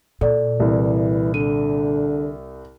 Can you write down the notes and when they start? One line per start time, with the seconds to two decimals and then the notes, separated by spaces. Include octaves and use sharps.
0.21 A#2 A4 D5
0.60 C2 E3
1.34 D3 D#7